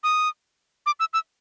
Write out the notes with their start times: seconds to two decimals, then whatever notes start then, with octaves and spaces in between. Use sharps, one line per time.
0.04 D#6
0.86 D6
1.00 E6
1.13 E6